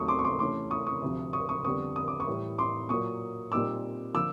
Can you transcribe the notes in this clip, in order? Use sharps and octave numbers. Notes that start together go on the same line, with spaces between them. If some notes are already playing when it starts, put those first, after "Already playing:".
Already playing: D#2 D#3 F#3 A3 C4 C#6 D#6
C6 D6
C#6
C6 D6
C3 E3 A3 C#4 C6 D6
C#6 D#6
C#6 D#6
D2 C3 F3
C#6 D#6
C#6 D#6
F2 D3 G3 B3 C#6 D#6
D#6
D6
C#6 D#6
A2 E3 G3
C6 D6
A#2 F#3 A#3 C#6 D#6
A#2 G3 C4 D#4 D6 E6
D3 F3 A#3 D6 E6